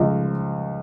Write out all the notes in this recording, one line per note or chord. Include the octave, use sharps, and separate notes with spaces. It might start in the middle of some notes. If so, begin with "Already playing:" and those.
Already playing: C#2 F3